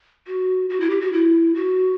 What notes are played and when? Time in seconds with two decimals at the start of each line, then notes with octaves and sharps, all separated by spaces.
0.27 F#4
0.70 F#4
0.80 E4
0.90 G4
1.01 F#4
1.13 E4
1.55 F#4